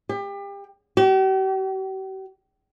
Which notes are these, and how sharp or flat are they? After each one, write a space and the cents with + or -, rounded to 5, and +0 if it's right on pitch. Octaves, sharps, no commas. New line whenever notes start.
G4 +30
G4 -45